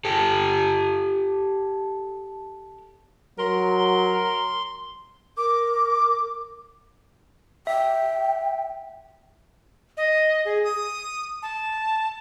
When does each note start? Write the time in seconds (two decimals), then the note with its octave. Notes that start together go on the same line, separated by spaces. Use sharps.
0.05 G4 A4
3.39 F#3 A#4 C6
5.37 A#4 D6
7.67 E5 G5
9.97 D#5
10.45 G#4
10.64 D#6
11.43 A5